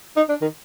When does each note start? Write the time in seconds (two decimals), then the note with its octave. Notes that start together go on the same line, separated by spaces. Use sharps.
0.16 D#4
0.29 D4
0.41 D#3